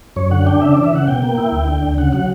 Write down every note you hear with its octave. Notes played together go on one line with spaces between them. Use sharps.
F#2 C#5
D3 F#5
D4 G5
C#3 E5
E3 D5
E5
C#3 F#5
B2 G5
A#3
E4
D2
D3
D2
C#3 F#5
F#3 F#5